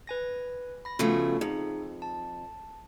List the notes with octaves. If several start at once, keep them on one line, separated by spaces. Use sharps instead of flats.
B4 G#5 A#6
B5 A#6
C#3 F3 A3 B3 F#4 B5
F2 D#4 G#4
A5